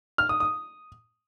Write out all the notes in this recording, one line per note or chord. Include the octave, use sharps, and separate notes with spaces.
F6
D#6
D#6